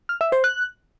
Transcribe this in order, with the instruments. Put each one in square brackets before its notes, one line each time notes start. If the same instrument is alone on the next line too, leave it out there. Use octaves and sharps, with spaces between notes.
[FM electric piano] F6
E5
C5
F#6